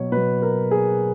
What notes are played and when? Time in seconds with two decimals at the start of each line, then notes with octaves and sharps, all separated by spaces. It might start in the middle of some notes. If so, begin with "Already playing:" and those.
Already playing: B2 F#3 C#5
0.12 B2 F#3 B4
0.42 A#4
0.71 G#4